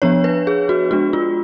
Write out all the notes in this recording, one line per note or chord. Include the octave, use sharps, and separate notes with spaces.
F3 B3 D4 C#5
B4
G#4
F#4
G#3 D4 F#4
F4